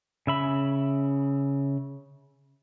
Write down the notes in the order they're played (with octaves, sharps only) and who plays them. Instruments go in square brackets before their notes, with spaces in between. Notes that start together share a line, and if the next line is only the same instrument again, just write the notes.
[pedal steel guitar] C#3 E5 B5